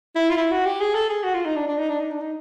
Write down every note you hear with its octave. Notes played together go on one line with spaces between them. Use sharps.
E4
F4
E4
F#4
G4
G#4
A4
G#4
F#4
F4
D#4
D4
D4
D#4
D4
D#4
D4
D#4